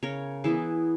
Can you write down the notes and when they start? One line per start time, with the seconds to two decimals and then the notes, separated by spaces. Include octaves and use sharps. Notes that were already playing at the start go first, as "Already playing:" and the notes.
0.03 C#3 A#4 C#5
0.44 E3 B3 E4 G#4